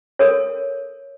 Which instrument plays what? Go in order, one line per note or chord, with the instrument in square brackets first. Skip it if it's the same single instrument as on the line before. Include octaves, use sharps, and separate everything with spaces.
[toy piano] A4 A#4 C#5